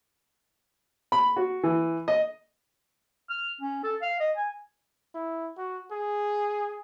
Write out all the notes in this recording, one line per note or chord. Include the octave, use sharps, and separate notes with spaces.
B5
F#4
E3
D#5
F6
C#4
A4
F5
D#5
G#5
E4
F#4
G#4